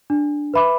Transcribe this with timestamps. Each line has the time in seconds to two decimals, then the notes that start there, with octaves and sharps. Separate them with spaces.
0.10 D4
0.54 B4 E5 B5 D6